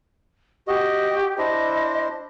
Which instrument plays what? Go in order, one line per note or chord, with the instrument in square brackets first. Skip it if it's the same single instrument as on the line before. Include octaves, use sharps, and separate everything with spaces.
[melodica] F#4 D#5 [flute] G4
[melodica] D4 E4 C5 [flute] D#5